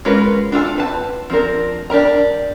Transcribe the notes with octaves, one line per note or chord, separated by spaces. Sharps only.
G#3 C#4 F4 A#4 B4
D4 F4 A4 G#5
C4 B4 A5
F3 C4 D4 A#4
D4 G4 A#4 A#5